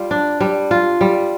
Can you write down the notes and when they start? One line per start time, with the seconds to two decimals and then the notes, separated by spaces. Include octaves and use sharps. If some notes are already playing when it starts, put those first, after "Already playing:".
Already playing: G3 F4
0.11 D4
0.41 G3
0.71 F4
1.01 G3